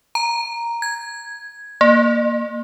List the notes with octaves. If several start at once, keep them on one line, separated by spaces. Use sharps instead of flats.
A#5
G#6
A#3